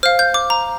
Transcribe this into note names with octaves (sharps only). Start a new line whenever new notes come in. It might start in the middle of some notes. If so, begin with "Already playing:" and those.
C5 F5 F6
G6
D6
A#5